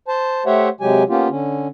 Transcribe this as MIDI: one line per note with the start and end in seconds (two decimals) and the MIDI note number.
0.08 0.43 72
0.08 0.43 81
0.46 0.69 57
0.46 0.69 67
0.46 0.69 72
0.46 0.69 73
0.46 0.69 76
0.46 0.69 78
0.81 1.03 48
0.81 1.03 54
0.81 1.03 56
0.81 1.03 67
0.81 1.03 80
1.09 1.28 58
1.09 1.28 59
1.09 1.28 61
1.09 1.28 65
1.09 1.28 67
1.29 1.67 50
1.29 1.67 61